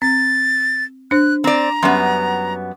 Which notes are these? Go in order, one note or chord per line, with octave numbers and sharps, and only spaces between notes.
C4 A6
D4 C5 F#6
C4 D5 A#5
F#2 G3 B3 C6